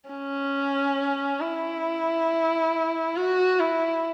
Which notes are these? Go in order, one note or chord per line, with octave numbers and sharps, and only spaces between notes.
C#4
E4
F#4
E4